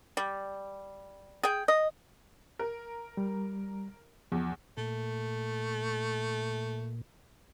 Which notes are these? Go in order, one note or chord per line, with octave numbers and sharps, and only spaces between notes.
G3
G#4 G5
D#5
A#4
G3
E2 F3
A#2 A3